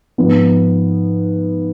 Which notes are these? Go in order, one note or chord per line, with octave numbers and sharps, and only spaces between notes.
G#2 F3 B3